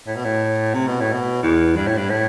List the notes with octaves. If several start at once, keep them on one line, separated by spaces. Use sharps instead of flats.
A2
B2
A2
C3
B2
A2
B2
E2
G2
A2
G2
A2